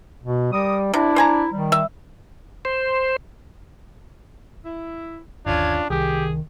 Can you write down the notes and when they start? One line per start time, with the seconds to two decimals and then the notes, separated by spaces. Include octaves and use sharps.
0.23 B2
0.52 G3 A#4 D6 D#6
0.94 C3 D4 E4
1.16 C5 G#5 A#5
1.52 D#3 G3
1.72 E5
2.65 C5
4.65 E4
5.46 G1 D#2 C#4 D4 F4 G#6
5.90 C2 D#3 G4 G#4